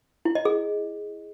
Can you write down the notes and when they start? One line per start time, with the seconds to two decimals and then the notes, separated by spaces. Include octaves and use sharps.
0.25 E4
0.35 D#5
0.45 G#4